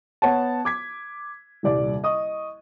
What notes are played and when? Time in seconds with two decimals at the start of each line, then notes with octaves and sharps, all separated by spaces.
0.22 B3 C#5 F#5 A5
0.65 D6 G#6 B6
1.63 D#1 C2 D5
2.04 D#5 C#6 D#6